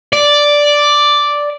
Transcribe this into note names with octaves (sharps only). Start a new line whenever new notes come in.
D5